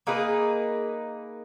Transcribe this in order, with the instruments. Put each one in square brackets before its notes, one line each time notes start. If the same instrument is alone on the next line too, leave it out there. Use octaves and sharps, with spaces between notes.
[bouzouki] A#3 D#4 G#4 B4